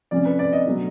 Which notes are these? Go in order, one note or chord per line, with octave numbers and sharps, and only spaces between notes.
C3 F3 A3 C#4 D5
B4
D5
D#5
B2 F#3 A3 D4